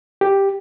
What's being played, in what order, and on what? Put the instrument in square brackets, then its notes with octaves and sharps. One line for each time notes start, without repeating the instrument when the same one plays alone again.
[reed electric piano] G4